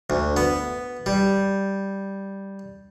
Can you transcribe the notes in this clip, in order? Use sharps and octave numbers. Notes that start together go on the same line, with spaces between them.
D2
B3
G3